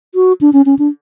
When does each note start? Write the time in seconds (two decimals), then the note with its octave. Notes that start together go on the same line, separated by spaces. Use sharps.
0.15 F#4
0.41 D4
0.53 C#4
0.66 C#4
0.79 D4